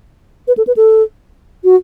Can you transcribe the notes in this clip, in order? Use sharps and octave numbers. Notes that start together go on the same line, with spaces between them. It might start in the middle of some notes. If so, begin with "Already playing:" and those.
B4
A4
B4
A4
F#4